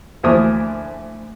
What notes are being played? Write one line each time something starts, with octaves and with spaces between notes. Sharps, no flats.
D2 E3 F3 A#3 D#6